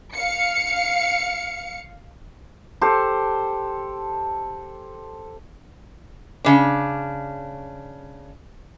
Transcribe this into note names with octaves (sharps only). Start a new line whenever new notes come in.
F5 C#7
G4 A4 C5
C#3 D4